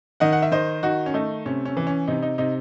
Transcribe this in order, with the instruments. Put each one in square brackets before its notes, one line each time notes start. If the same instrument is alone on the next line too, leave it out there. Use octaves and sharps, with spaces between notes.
[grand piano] D#3 D#5 F#5
F#5
E5
D#3 C5 D#5
D#3 D#4 F#4
C#4
A3 D#4
C3 C#4
C#4
E3
C#4
C3 D#4
D#4
C3 D#4